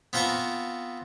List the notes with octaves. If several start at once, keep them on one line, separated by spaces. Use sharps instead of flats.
B3 C4 F4 A5 A#5 C#6